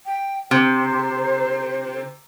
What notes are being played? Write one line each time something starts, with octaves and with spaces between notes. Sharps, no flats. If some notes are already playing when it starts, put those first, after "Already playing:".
G5
C3 C5